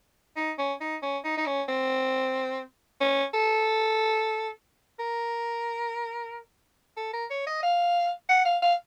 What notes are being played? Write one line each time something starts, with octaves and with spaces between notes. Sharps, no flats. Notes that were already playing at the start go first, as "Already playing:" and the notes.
D#4
C#4
D#4
C#4
D#4
D#4
C#4
C4
C#4
A4
A#4
A4
A#4
C#5
D#5
F5
F#5
F5
F5